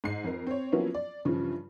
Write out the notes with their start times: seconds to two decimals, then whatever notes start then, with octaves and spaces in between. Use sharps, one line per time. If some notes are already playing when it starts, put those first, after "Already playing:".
0.04 G#2 C7
0.24 F2 A#4
0.47 C4 C#5
0.72 F3 F#3 A#3 B3 C#4 E4
0.94 D5
1.25 G2 C#3 E3 F3